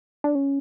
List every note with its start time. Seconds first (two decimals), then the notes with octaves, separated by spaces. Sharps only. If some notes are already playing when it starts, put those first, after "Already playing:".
0.24 D4
0.35 C#4